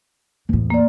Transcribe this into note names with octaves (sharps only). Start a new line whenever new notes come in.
E2 A2
A#3 D5